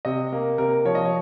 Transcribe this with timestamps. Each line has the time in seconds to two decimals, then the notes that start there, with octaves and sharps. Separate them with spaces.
0.05 C3 D#5
0.32 A#3
0.58 C3 A#4
0.85 F3 C#5
0.95 D#5
1.05 C#5